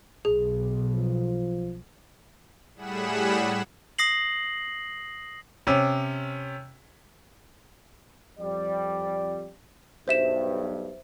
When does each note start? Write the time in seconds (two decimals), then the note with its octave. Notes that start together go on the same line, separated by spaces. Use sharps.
0.25 B1 G#4
0.94 F3
2.76 A2 G3 G#4 F#5 B5 E7
3.98 D#6 A#6 C7 F#7
5.67 C3 C#4
8.40 F2 G3 D5
10.08 B1 G2 C5 E5 E7